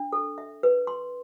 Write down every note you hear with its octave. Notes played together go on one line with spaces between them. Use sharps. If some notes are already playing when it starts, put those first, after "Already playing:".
Already playing: D4
A4
E5
B4
C6